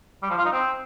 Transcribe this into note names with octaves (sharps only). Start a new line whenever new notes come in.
G3
F3
F4
D#4
C4